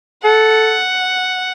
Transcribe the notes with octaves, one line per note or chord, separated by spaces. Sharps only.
A4 F#5